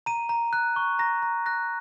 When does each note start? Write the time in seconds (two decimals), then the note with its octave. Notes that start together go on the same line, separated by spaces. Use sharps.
0.06 A#5 D#7
0.29 A#5
0.53 F#6
0.76 C#6
0.99 A#5 A#6
1.22 A#5
1.46 F#6 A#6